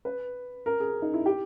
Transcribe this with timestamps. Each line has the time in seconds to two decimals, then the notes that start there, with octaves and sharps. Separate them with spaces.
0.05 B4
0.66 A#4
0.80 G#4
1.02 D#4
1.14 E4
1.26 G4